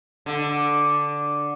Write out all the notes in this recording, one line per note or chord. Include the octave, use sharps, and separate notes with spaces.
D3